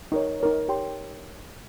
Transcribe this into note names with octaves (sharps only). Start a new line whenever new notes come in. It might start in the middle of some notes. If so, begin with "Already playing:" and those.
D#4 A#4 C#5
D#4 A#4 C#5
G4 C#5 G5 C6